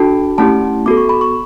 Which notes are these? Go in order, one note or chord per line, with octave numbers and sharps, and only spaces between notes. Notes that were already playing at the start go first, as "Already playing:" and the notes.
Already playing: D4 F#4 A4 A5
A3 C#4 E4 G4 A5
B3 F#4 A4 D6
C#6
B5
C#6